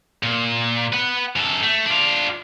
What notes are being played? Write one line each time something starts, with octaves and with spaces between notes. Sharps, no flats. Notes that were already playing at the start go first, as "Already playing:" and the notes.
A#2
B4 F#5
F#2 A4
A3
D4 F4